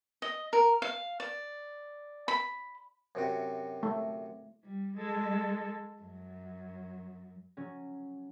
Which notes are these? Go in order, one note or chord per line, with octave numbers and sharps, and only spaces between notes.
D#5
A#4
F5
D5
B5
F#2 C3 F#4
A3
G3
G#3 A4
F#2
F#3 C#4